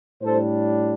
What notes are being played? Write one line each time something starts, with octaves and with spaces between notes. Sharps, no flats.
A2 G3 D4 A4 C5